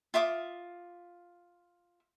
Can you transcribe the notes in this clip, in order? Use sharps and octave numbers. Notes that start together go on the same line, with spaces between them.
F4 E5 D6 D#6